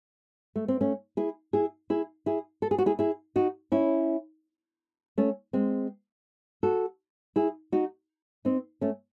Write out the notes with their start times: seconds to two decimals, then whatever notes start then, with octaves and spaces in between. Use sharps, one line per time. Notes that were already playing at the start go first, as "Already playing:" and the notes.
0.56 A3
0.68 C4
0.81 A3 C#4
1.17 E4 G#4
1.53 E4 G#4
1.90 E4 G#4
2.26 E4 G#4
2.62 A4
2.71 G#4
2.78 F#4
2.86 E4 G#4
2.99 E4 G#4
3.36 D#4 F#4
3.72 C#4 E4
5.18 A3 C#4
5.53 G#3 C4
6.63 F#4 A4
7.36 E4 G#4
7.72 D#4 F#4
8.45 C4 D#4
8.81 A3 C#4